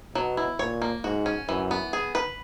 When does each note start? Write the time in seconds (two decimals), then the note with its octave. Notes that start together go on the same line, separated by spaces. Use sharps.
0.15 B2 F#3
0.37 E4
0.59 A#2 C#5
0.82 A#3
1.04 G#2 F#4
1.26 C#4
1.48 F#2 E3
1.71 B3
1.93 G#4
2.15 B4